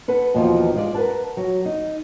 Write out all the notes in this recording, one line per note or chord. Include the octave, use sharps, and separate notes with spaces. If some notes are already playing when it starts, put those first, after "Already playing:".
A4 B4 F#5 A5
D#2 B2 E3 F3 D#4 F4
G#3 F4 G4 D5
A#4 B4 F5 F#5 A5
F#3
D#4